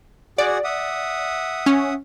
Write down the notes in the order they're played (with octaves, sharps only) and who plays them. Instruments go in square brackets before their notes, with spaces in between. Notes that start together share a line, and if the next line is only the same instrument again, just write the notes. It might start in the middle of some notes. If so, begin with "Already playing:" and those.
[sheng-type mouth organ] F#4 G#4 F#5 [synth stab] D5
[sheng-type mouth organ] E5 F#5 D#6
[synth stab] C#4